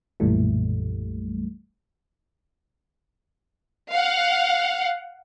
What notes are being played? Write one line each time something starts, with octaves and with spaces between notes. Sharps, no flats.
B1 F#2 A#2 E3 G3 A3
F5 F#5